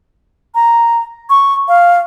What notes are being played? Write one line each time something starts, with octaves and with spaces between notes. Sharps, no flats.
A#5
C#6
F5